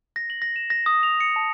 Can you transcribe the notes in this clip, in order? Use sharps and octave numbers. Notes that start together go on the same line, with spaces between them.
A#6
F#7
A#6
E7
A#6
D#6
F7
C#7
A5